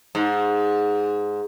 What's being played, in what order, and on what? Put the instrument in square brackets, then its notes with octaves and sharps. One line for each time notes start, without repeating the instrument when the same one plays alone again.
[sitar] G#2